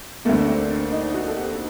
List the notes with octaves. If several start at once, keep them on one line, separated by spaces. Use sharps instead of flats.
D2 D3 A3 A#3
D4
C4
D4
D#4
F#4
A4
G4